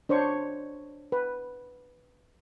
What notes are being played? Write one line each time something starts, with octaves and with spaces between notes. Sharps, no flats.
D4 C5 C#5 C#6
B4